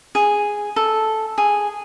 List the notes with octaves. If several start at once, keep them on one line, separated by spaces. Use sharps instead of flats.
G#4
A4
G#4